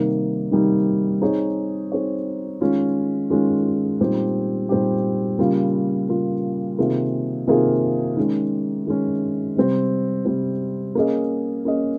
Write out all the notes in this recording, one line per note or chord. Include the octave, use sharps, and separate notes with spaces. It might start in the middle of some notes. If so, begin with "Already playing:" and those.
Already playing: C3 D#3 G3 A#3 D#4
C3 D#3 G3 A#3 D#4
C4 D#4 G#4 C#5
C4 D#4 G#4 C#5
D#3 G#3 C#4 F4
D#3 G#3 C#4 F4
A#2 G3 C4 D#4 G4
A#2 G3 C4 D#4 G4
C#3 G3 A#3 F4
C#3 G3 A#3 F4
C3 D#3 A#3 F4 G#4
C3 D#3 A#3 F4 G#4
D#3 G#3 C#4
D#3 G#3 C#4
C3 G3 C4
C3 G3 C4
A#3 C#4 G#4 D#5
A#3 C#4 G#4 D#5